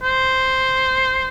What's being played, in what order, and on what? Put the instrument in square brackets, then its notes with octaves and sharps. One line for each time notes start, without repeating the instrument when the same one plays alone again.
[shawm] C5